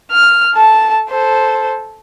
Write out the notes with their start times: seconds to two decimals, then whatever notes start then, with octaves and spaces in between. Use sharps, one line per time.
0.12 F6
0.54 A4 A5
1.10 A4 C5